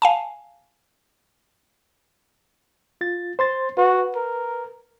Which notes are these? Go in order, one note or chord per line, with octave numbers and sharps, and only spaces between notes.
F5 G#5 A5
F4 A6
C5 C6 A6
F#4 B4
A#4